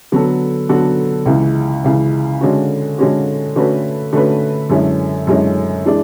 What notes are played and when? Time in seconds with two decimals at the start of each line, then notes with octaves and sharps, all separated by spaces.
0.12 D3 F#3 B3 F#4 A4
0.69 D3 F#3 B3 F#4 A4
1.26 C#2 C#3 E3
1.84 C#2 C#3 E3
2.41 D3 G#3 C#4 F#4
2.98 D3 G#3 C#4 F#4
3.56 D3 A3 C#4 F#4 B4
4.13 D3 A3 C#4 F#4 B4
4.70 F#2 D3 G#3 C#4 E4
5.27 F#2 D3 G#3 C#4 E4
5.85 E3 G#3 D4 G#4